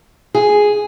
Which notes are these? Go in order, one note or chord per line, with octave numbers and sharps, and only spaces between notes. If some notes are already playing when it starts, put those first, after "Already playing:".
G#4